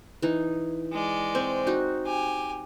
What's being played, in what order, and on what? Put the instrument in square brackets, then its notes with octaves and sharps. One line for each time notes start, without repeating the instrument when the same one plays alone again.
[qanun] E3 D#4
[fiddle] G#3 D5
[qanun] C4 C5 C#6
D#4 F#4
[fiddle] G4 G#5